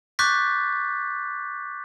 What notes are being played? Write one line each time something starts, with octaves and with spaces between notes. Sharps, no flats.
C#6 D6 F#6 G6 A6 B6